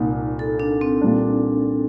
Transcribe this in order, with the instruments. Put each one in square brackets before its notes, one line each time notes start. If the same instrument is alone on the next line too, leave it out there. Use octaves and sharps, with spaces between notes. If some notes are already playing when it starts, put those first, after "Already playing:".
Already playing: [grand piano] C2 A#2 [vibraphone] D#4
[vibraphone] A4
D4
C4
[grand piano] A#2 G3 D4